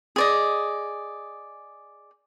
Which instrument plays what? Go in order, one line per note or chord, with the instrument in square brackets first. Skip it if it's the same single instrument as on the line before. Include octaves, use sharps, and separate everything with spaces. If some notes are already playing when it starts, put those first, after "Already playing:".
[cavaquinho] G#4 D5 D#5